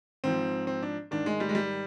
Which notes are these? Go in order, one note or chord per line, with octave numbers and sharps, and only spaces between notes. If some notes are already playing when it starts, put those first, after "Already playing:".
G#2 F3 C4
C4
D4
G#2 D#3 D4
G#3
G3
G#3
G3